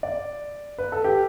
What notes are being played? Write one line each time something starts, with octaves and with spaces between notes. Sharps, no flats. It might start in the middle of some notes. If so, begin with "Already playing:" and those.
D5
B4
A4
G4